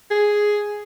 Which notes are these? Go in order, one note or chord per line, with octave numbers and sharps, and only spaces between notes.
G#4